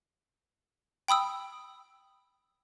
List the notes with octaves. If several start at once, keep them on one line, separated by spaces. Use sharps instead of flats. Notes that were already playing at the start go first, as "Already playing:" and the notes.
G5 B5 D#6 E6